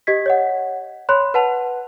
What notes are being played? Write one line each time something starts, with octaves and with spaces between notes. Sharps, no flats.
G4 D#5 G#6 B6
C#5 D#5 F#5
C#5 B5 C6 F#6
B4 F#5 A5 F7